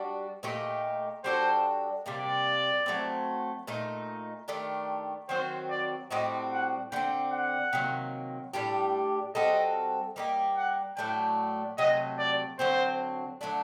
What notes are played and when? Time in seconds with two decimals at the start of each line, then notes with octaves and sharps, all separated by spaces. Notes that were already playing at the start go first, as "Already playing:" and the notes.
Already playing: G3 D4 F#4
0.43 A#2 A3 D#4 G4
1.24 G3 D4 F#4 A4 C5
2.05 C3 G3 A#3 D5
2.86 F#3 A3 C4
3.67 A#2 A3 D#4
4.48 D#3 A3 D4 G4
5.29 D#3 F#3 C4 F#4 C5
5.70 D5
6.11 A2 G3 C4 F#4 D#5
6.51 F#5
6.92 D3 A3 G5
6.96 C4
7.33 F#5
7.73 C3 D#3 F#3 A#3
8.53 A2 G3 D4 G4
9.35 G3 C4 F#4 A4 D#5
10.16 G3 A#3 D#4 G4 D#5
10.57 F#5
10.97 A2 F#3 A3 D4 G5
11.78 C3 F#3 A3 D#5
12.19 D5
12.59 D3 F#3 C4 C5
13.41 D3 F#3 A3 D4